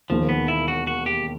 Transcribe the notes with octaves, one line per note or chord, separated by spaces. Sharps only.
E1 D#2 D#3 F3
B3
E4
F#4
F#4
G4